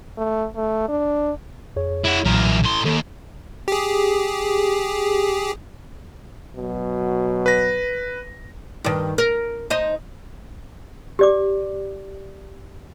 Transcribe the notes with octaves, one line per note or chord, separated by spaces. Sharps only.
A3
A3
D4
F2 G#4 C#5
E4 F#4
B1 E2 A#2 F#3 A#4
A2 C6
D#2 A4
G4 G#4
B2 F#3
B4 A#6
G2 D#3
A#4
D#4 C5 D#5
G4 D5 D6